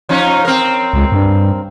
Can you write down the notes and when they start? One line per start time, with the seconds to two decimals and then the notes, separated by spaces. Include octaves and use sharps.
0.09 F3 C#4 D#4
0.45 C4 A#4
0.93 C#2
1.12 G2